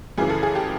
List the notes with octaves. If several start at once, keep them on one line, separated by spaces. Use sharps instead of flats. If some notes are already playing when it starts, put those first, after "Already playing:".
F#2 C#3 E3 G#4
A4
G#4
G4